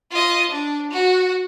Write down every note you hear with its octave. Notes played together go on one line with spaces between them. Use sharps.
F4 D#5
D4
F#4